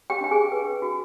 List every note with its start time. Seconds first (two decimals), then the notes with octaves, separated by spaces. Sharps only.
0.10 G4 G5
0.20 D4 G5
0.31 G#4 G#5
0.52 B4
0.82 F#4